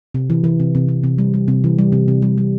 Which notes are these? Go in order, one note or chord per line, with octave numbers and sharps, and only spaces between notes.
C3
E3
E3
C3
C3
C3
C3
G3
G3
C3
E3
G3
C3
C3
G3
G3